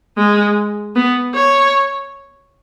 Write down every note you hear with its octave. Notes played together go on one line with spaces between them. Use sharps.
G#3
B3
C#5